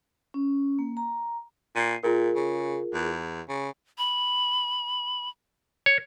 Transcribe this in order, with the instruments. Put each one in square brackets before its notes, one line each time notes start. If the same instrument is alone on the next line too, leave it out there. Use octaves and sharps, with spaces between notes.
[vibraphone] C#4
A#3
A#5
[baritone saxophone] A#2 [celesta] C7 D#7
[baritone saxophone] A#2 [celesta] F4 G#4 A#4
[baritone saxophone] C#3
E2
C#3
[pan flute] B5
[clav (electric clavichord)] C#5